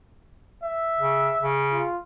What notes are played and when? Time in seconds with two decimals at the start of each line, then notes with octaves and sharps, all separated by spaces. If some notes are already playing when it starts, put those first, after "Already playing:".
0.63 E5
0.99 C#3
1.41 C#3
1.72 F4